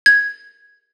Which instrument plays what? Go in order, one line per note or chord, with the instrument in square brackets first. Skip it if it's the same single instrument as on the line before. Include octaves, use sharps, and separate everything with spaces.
[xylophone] G#6